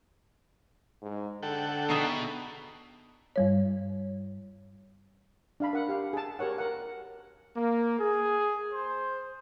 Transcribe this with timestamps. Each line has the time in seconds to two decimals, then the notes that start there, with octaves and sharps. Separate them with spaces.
1.02 G#2
1.43 D3 A4 F#5 G5
1.90 B2 D#4 G#4 E5
3.36 G2 G3 C#5
5.60 D4 F5 B5
5.73 A#4 F#5
5.89 G4 F5
6.13 G#4 A5
6.39 G4 A#4 C#5 F#5
6.58 A#4 F#5
7.57 A#3
7.99 G#4
8.74 C5